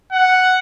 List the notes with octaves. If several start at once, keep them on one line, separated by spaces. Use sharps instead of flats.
F#5